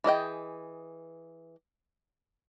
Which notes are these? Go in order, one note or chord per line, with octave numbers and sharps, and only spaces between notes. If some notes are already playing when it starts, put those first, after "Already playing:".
E3 G#4 D#5 G5